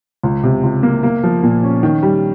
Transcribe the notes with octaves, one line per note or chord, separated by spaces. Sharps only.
C#2
C3
C#2
A#3
A#3
F3
A#2
C#4
D#3
G3